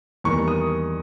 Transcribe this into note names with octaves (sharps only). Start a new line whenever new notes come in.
E2 D#3 G3 A#3 C#6
D#6